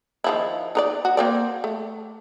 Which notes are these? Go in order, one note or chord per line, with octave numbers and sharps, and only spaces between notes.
D#3 F3 E4
D#4 A#4 D5
F#4
A#3 C4 D5
A3